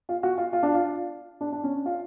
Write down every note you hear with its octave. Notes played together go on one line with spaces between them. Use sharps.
F4
F#4
F4
F4
D4
F4
D4
D4
C#4
F4